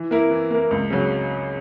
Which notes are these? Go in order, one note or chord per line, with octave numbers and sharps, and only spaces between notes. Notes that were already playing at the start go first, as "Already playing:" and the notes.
Already playing: E3
A#3 E4 A#4
E3
A#3 E4 A#4
C#2
C#3 F#3